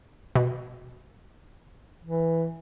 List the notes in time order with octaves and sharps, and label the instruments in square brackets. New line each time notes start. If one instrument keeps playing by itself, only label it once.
[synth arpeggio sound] B2
[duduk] E3